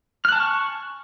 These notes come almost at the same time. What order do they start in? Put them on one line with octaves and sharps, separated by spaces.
F6 F#6 A5 G#5 C#6